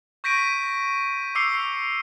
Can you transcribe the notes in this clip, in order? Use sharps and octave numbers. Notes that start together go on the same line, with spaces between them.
C#6 G6 A#6 B6 D7 D#7
D6 E6 C7 C#7